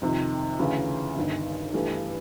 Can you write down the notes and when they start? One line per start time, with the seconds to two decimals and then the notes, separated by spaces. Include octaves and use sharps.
0.02 F2 C3 D#3
0.59 D2 C#3 E3
1.16 G1 G2 D#3
1.74 G2 E3 A3 D4 G4